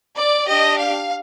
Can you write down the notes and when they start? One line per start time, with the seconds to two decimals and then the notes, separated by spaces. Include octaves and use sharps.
0.16 D5
0.47 D4 G4 D#5
0.78 F5